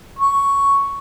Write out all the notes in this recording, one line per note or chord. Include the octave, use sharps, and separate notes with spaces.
C#6